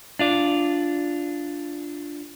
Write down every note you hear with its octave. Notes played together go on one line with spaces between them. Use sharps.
D4 F4 D5